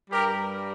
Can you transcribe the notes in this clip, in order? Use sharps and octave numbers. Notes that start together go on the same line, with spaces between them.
G2 G3 G4 A#4